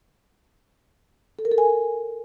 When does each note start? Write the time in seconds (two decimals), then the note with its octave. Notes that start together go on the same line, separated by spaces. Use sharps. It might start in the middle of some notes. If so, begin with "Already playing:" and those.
1.39 A4
1.45 A#4
1.52 A4
1.58 G#5